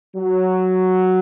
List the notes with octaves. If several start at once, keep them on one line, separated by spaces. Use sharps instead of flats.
F#3